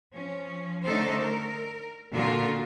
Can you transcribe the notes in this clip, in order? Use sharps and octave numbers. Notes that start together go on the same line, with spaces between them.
F3 C#4
D3 A3 C#4 D#4 A4 C5
A#4
A#2 D3 F4 F#4 A#4